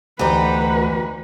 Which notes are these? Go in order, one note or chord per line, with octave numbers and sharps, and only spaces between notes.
D2 E3 D#4 F#4 G4 B4